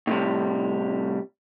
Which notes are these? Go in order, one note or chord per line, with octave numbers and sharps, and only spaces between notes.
A2 C3 G3